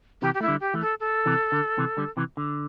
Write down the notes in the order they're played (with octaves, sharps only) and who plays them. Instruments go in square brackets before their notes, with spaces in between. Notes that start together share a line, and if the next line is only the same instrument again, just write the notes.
[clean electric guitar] C3 E3 [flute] G4
[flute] G4
[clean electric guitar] A3 [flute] E4
[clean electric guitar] D3 G3
[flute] G4
[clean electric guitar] E3 A3
[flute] A4
A4
[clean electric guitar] C3 E3
D3
C3 E3
D3 G3
C3 E3
D3